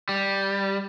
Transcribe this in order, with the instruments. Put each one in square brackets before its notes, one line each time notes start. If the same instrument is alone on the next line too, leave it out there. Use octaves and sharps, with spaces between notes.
[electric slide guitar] G3